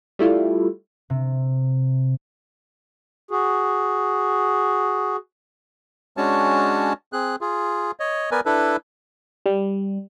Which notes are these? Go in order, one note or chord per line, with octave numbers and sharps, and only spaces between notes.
G3 A3 E4 F4
C3
F#4 G#4
G#3 C#4 D4 F#4 C#5 A5
C4 G#4 F#6
F4 G#4
C#5 D#5
B3 A#4 B4 D5 G#5
D4 E4 A4 B4
G3